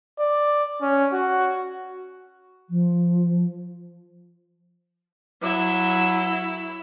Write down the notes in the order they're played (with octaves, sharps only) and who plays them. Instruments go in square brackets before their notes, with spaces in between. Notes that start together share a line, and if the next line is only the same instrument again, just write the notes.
[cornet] D5
C#4
F#4
[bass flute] F3
[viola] F#3 [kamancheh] E4 E6